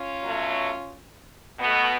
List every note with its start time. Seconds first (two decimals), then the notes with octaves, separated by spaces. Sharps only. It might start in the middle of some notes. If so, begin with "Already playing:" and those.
Already playing: C#4 F4
0.23 B2 F#3 A3
1.59 B2 A3 B3